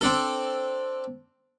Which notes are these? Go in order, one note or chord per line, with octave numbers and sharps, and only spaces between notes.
C4 D4 A4